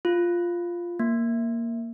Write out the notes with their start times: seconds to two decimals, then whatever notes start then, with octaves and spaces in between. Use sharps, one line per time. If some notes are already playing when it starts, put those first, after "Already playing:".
0.05 F4
0.99 A#3